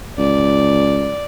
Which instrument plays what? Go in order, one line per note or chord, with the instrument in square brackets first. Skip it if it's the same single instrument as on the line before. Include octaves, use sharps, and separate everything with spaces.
[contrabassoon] C#2 [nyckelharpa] D5